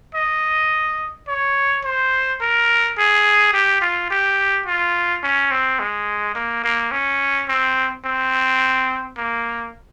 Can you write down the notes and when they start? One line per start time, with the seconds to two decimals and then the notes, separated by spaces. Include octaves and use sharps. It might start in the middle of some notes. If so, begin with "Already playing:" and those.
0.15 D#5
1.28 C#5
1.84 C5
2.41 A#4
2.97 G#4
3.53 G4
3.81 F4
4.10 G4
4.66 F4
5.23 C#4
5.51 C4
5.79 G#3
6.35 A#3
6.63 A#3
6.91 C#4
7.48 C4
8.05 C4
9.17 A#3